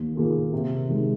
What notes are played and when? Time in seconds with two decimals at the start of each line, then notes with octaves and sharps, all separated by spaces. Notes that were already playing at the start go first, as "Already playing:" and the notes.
Already playing: D#2
0.15 D#3 A#3 F4 G#4
0.53 C3
0.89 D#3 G#3